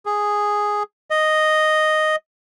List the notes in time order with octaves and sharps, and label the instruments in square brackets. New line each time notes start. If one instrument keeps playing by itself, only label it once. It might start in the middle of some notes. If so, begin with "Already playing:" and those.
[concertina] G#4
D#5